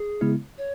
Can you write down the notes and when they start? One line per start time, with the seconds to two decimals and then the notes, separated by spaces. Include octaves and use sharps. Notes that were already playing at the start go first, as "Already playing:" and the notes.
Already playing: G#4
0.21 C#3 G#3 B3 E4
0.58 C#5